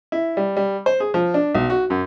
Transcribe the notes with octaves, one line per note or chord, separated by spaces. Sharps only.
E4
G3
G3
C5
G#4
F3
D4
B1
F#4
F#2